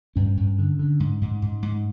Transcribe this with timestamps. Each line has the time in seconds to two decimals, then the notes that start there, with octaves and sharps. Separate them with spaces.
0.16 G2 C#4
0.37 G2
0.59 D3
0.79 D3
1.00 G#2
1.22 G#2
1.42 G#2
1.63 G#2